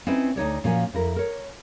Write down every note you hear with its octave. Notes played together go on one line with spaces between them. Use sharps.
C4 C#4 D#4 E4 B4 C5
D2 D#4 C#5 D5
A#2 F3 C#4 F#4 A#4 G#5
F2 E4 A#4
A#4 C#5